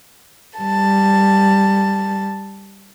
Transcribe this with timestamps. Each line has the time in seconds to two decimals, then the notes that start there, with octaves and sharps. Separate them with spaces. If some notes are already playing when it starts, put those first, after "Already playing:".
0.57 G3 A5